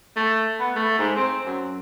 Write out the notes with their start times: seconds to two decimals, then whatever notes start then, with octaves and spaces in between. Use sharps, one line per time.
0.16 A3
0.60 B3
0.76 A3
0.99 G#2
1.17 C4
1.46 F#2